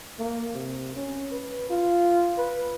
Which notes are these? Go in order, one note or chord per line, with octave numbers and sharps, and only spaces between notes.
A#3
C3
C#4
B4
F4
B4